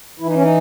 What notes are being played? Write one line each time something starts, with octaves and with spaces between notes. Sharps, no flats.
E3 E4
D#4
C#4
D#4